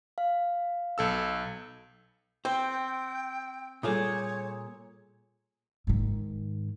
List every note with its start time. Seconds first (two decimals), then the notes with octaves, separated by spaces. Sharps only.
0.18 F5
0.98 B1 A4 E6
2.45 C4 C5 G5
3.83 A#2 G3 F4 G#4 A4 C#5 D#6
5.87 G#2 D#3